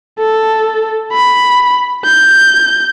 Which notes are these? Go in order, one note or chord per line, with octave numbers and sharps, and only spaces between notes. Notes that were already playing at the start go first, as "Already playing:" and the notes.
A4
B5
G6